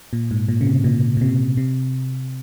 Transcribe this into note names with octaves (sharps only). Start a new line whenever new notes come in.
A#2
G#2
A#2
C#3
C3
A#2
A#2
C3
C3